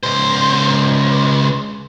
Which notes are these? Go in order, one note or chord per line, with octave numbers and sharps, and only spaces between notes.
C#2 C5